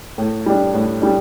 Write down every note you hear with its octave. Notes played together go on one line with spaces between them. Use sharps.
A2
G3 D4
A2
G3 D4